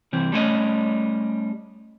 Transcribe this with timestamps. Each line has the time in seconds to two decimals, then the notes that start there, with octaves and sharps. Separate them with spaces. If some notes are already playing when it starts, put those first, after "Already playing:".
0.13 C2 E3 C4
0.32 G3 A3 C#4 E4 C#5 D#5